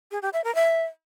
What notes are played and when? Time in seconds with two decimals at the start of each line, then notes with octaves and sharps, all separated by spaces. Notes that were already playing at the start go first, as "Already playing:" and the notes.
0.11 G#4
0.22 G4
0.33 E5
0.44 A#4
0.55 E5